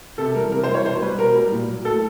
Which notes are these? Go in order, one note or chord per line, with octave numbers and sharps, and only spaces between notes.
C3 A4
E3 G3 A#4
C3 A#4
C5
E3 G3
C#5
B2 C5
G3 B4
B2 A#4
G3
A#2
F#3
A2 A4